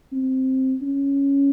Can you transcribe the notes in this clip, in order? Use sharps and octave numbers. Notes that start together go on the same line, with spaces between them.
C4
C#4